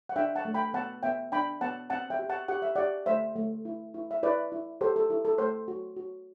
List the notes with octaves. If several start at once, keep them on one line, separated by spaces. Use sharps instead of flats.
F#5
D4 E5 G5
F#5 A5
A3
G5 B5
B3 F#5 A5
B3 E5 G5
D4 G5 B5
B3 F#5 A5
C4 F#5 A5
E5 G5
G4
F#5 A5
G4 F#5
E5
G4 D5 F#5
A3 C5 E5
A3
E4
E4
E5
E4 B4 D5
E4
G4 A4 C5
A4
E4 A4
A4
A3 A4 C5
F#4
F#4